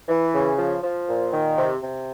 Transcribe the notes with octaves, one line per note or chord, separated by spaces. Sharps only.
E3
C#3
F3
F3
A#2
D#3
C3
C3